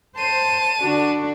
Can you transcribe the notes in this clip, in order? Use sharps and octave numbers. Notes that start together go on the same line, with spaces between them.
C5 A5 D#7
D3 D4 F#4